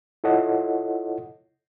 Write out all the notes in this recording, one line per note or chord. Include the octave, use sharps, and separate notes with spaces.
E4 F4 A4 C#5 D#5 F#5